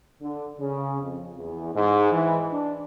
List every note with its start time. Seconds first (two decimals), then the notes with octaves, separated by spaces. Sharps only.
0.21 D3
0.59 C#3
1.01 F2
1.37 E2
1.74 G#2
2.11 E3
2.52 D4